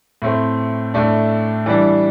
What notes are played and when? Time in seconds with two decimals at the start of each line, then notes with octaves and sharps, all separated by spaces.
0.22 A2 A3 C4
0.94 A2 A3 D4
1.66 E3 G3 D4